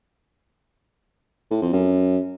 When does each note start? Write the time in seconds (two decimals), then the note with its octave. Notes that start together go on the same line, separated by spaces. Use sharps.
1.51 A2
1.62 F2
1.73 F#2